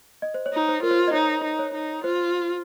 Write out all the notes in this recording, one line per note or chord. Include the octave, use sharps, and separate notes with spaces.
D#5
C5
C#5
D#4
C5
F4 A#4
C5
D#5
D#4 C#5
D#4
C#5
D#4
F4 C5